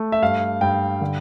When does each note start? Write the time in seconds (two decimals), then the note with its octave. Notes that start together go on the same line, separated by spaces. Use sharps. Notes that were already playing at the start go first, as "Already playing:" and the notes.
Already playing: A3
0.12 E5
0.22 G2 F5
0.61 G2 G5
1.01 D3